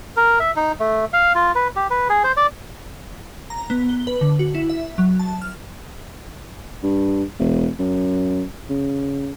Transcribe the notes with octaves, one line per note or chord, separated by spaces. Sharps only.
A#4
E5
D#4
A3
F5
F4
B4
G4
B4
G#4
C5
D5
A#5
B3
G7
B4
D3
F#4
E4
E5
F#3
A5
F6
G2
E1
F#2
C#3